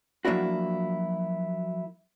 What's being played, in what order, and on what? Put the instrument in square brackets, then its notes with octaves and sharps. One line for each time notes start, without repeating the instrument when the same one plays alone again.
[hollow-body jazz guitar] F3 F#3 A#3 D4 E4 F#4